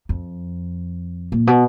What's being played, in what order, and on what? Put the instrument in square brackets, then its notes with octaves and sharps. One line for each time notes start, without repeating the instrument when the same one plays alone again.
[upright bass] F2
A#2
B2